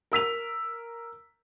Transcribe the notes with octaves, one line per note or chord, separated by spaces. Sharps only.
A#4 E6 B6 F7